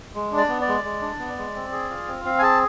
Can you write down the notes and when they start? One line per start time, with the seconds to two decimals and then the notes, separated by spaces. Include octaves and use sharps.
0.15 G#3
0.32 D4
0.37 D5
0.49 B3
0.62 D5
0.67 G#3
0.84 G#3
1.02 D4
1.19 B3
1.38 G#3
1.55 C4
1.72 G#4
1.90 F4
2.07 C4
2.25 C4 F5
2.39 G#5
2.42 G#4 A5